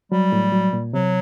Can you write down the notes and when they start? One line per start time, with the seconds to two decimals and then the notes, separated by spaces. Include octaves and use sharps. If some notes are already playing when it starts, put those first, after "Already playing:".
0.12 F#3 G3
0.32 A2
0.52 F#3
0.73 A#2
0.93 C3 F#3